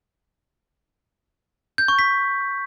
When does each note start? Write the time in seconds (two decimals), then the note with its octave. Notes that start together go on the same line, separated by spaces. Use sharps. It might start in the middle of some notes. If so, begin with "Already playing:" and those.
1.78 G6
1.88 C#6
1.99 B6